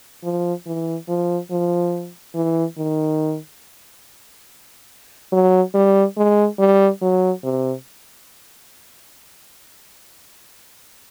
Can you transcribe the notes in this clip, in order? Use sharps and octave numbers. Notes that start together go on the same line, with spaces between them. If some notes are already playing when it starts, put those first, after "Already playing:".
F3
E3
F3
F3
E3
D#3
F#3
G3
G#3
G3
F#3
C3